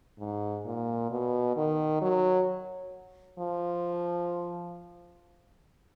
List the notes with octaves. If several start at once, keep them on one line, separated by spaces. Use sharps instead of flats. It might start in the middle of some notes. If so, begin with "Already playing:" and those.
G#2
A#2
B2
D#3
F#3
F3